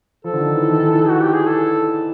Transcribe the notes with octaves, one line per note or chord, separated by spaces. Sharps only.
F3 A4
D3
D#3
E3
D#3
E3
F#4
G4
G#4
A4